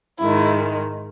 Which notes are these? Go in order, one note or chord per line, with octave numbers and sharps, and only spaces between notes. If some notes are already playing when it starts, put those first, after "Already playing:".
G#2 D#3 G#3 E4